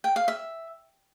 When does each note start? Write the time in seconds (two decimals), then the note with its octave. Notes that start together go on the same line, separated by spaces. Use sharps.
0.04 G5
0.16 F5
0.28 E5